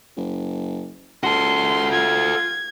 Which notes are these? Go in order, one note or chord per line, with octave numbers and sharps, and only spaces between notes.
F#1
C#2 F#4 A4 C6
F4 G#6